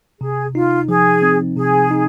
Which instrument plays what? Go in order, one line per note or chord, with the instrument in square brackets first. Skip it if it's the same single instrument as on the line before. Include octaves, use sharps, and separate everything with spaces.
[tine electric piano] C3 [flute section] G#4
[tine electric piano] D#4 [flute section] F4
[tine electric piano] F3 [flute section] G#4
[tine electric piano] C4
[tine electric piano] C3 [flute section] G#4
[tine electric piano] D#4